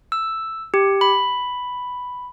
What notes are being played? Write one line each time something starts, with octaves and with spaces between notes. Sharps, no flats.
E6
G4
B5